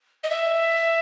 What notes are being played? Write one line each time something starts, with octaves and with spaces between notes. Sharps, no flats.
D#5
E5